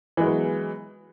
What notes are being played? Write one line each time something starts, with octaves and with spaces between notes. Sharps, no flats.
E3 F#3 G#3 B3